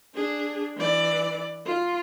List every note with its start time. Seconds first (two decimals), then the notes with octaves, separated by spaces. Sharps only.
0.14 D4 G#4
0.77 E3 D5
1.65 F4